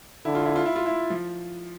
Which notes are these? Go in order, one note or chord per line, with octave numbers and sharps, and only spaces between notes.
D3 E4
F4
E4
F4
E4
F4
E4
F3